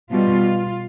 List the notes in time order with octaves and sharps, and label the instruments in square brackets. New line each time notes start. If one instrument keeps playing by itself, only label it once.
[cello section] B2 G3 F4